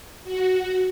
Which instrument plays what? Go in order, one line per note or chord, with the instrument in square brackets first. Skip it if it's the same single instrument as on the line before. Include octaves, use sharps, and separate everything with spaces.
[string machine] F#4